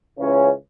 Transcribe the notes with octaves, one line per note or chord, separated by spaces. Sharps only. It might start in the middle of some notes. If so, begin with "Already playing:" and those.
C#2 C#3 E3 C#4